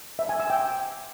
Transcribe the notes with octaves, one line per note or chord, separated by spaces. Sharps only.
E5
G#5
E6
G5